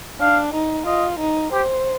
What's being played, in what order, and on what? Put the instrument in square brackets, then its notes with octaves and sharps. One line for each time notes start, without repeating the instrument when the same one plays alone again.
[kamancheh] D4 [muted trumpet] F5
[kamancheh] D#4
[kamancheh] F4 [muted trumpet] D#5
[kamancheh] D#4
[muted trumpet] G4 [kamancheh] C5